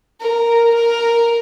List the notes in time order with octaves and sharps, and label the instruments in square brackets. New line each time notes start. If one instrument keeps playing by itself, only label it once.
[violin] A#4
A#4